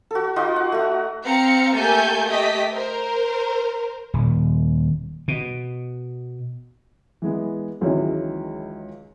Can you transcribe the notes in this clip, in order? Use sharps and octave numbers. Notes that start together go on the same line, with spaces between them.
F#4 A4
D#4 F4 F#4 D#5
F#5
A3 F#4
C4 F5 A#5 C#7
A3 A#3 G4 A4 G#5 G6
A3 G4 D#5 B6
A#4 C5
D#1
B2
E3 G#3 B3
C#2 D#3 E3 F#3 G#3 C#4